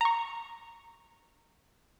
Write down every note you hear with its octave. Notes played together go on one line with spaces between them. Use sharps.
A#5 C#6